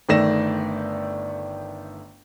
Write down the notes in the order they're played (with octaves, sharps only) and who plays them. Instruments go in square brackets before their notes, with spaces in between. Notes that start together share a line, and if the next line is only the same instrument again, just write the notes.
[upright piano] G1 D#3 A3 D4 A#6 E7